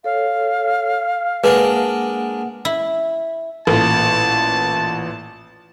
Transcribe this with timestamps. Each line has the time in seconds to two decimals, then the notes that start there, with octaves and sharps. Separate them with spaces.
0.04 A4 C#5 F5
1.44 G#3 A#3 D4 A#4 B4 F#5
2.65 E4
3.67 A1 A#2 A5